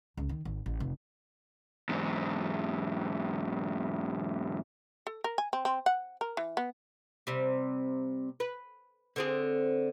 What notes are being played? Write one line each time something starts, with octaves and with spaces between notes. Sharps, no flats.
C#2
D#3
G#1
A1
F1
E2 G#2
A4
A#4
G#5
C4
C4
F#5
A#4
E3
B3
C3 G3
B4
D3 C4 G#4